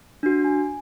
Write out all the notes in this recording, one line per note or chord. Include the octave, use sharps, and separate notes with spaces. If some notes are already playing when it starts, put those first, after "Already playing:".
D4 F#4
G#5